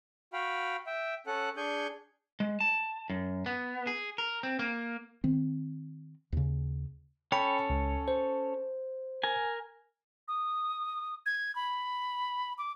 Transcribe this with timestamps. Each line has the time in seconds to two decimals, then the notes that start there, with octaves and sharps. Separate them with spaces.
0.33 F#4 F5 G5 B5
0.87 E5 G5
1.27 C#4 A4 F#5 F#6
1.57 D4 G#4 G#5 C#6 G6
2.40 G#3
2.60 A5
3.10 F#2
3.46 B3
3.87 G#4
4.18 A#4
4.43 C4
4.59 A#3
5.24 D#3 C4
6.32 D#2 C#3
7.32 C#4 A4 C#5 G5 B5
7.70 C#2
8.08 C5
9.23 A#4 G#5
10.28 D#6
11.26 G#6
11.55 B5
12.58 D6